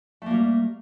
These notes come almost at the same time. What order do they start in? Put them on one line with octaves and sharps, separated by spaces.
A3 A#3 G3